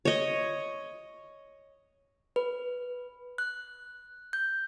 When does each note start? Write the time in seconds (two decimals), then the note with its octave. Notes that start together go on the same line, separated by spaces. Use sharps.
0.05 C#5 D#5
2.36 B4
3.38 F#6
4.33 G6